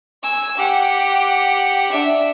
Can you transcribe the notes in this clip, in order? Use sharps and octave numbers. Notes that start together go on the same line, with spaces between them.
G#5 E6
G4 F#5
D4 E5